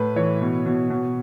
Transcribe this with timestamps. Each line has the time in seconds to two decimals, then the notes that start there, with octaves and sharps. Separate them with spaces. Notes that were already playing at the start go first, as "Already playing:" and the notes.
Already playing: A2 B4
0.16 E3 C#5
0.41 B2
0.66 B2
0.90 B2